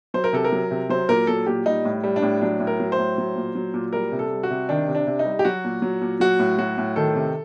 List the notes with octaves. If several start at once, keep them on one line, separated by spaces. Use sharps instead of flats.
F#3 C5
A#4
C3 A4
A#4
F#3
C3
F#3 C5
A#2 A#4
F#3 A4
A#2 G4
G3 D#4
A2
G3
D4
A2
F#3 D4
A2
A#4
F#3
C5
A2
F#3
A#2
F#3
A#2
G3 A#4
C3
A4
G3
F#4
C3
D#3 D4
C3
D4
C3
D#4
G3
G4
F#3 F#4
A#2
F#3
A#2
F#3 F#4
A2
F#3 F#4
A2
D#3 A4
C3